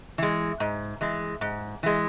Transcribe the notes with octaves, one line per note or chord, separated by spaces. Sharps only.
E3 G#3
G#2
E3 G#3
G#2
E3 G#3